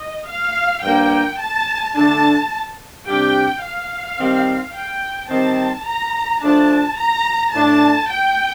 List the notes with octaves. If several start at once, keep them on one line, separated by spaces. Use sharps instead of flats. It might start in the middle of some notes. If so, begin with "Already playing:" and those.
Already playing: D#5
F5
G2 F3 A#3 D4 G5
A5
D3 A3 D4 A5
C3 G3 D4 G4 G5
F5
D#3 G3 C4
G5
D#3 G3 C4 A5
A#5
F3 A3 D4 A5
A#5
A2 A3 D4 A5
G5